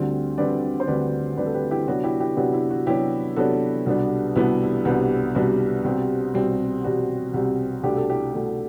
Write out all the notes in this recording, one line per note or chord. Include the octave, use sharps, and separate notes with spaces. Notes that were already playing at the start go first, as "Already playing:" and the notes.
Already playing: D2 D3 G3 C4
D2 D3 G3 C4 B4 D5
C5
D2 D3 G3 C4 B4 D5
D2 D3 G3 C4 B4 D5
A4
G4 B4
E4 G4
C3 F#3 B3 D4 F#4
E4 G4
E4 G4
C3 F#3 B3 D4 F#4
E4
F#4
C3 F#3 B3 D4 E4 G4
C3 F#3 B3 D4 F#4 A4
C2 B2 G3 B3 D4
C2 B2 G3 B3 D4 E4
E4
C2 B2 G3 B3 D4
C2 B2 G3 B3 D4 F#4
C2 B2 G3 C4
C2 B2 G3 C4
C2 B2 G3 C4 F#4
C2 B2 G3 C4
C2 B2 A3 D4 G4
A4
E4 G4
C2 B2 A3 D4